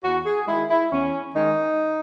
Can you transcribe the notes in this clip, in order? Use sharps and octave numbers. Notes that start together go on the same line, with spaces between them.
E2 F#4
G#4
D#3 G#3 E4
E4
E2 C#4
D#3 G#3 D#4